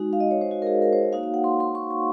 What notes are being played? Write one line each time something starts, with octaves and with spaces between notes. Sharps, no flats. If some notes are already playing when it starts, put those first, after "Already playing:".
Already playing: G#3 D#4 F#4
F5
D#5
C#5
C5
F#4
A#4
G#4
A#4
C5
C#5
A#3 D#4 F#4 F5
F5
F#5
C6
C6
C#6
C#6